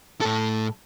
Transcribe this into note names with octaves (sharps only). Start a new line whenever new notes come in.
A2 A4